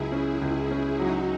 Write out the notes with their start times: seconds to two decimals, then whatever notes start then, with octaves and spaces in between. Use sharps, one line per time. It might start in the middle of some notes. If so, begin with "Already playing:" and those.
Already playing: C#2 F#3 E4 G#4
0.12 C#4
0.42 C#2
0.71 C#4
0.99 F#3 D#4 F#4